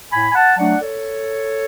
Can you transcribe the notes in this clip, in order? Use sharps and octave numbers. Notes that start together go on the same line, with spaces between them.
A2 G#5 B5
G#5
F#5 A5
F#3 A3 D4 D5 F#5
A4 C#5